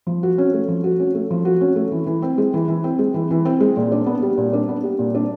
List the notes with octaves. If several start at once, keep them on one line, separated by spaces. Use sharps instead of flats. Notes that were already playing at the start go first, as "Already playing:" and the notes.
F3
F#4
C#4
A3
F3
F#4
C#4
A3
F3
F#4
C#4
A3
E3
E3
C4
G#3
E3
E3
C4
G#3
E3
E3
C4
G#3
A#2
D4
B3
G3
A#2
D4
B3
G3
A#2
D4